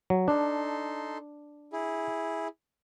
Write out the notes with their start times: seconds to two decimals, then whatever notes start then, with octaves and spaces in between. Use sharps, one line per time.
0.10 F#3
0.28 D4 D#4 A4 C6
1.73 E4 G#4